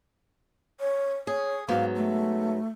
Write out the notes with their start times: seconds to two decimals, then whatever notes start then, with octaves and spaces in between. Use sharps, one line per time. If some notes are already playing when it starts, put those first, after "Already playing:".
0.80 C#5
1.27 G#4 C#5
1.68 G#2 F#3 B3 F5
1.95 A3